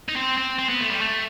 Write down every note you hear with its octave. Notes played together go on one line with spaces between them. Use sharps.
D#4
C4
C4
C4
B3
A3
G3
A3